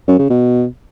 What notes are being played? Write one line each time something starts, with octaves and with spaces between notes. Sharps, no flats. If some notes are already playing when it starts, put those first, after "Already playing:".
F#2
C#3
B2